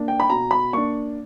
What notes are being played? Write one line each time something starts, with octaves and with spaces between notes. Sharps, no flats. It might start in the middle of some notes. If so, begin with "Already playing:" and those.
Already playing: A#3 D4
G5
B5
B2 A#5
B5
A#3 D4 C#6